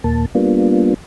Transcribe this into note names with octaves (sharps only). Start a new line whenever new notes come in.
D#2 A#2 A#3 A5
G3 A#3 B3 D4 F4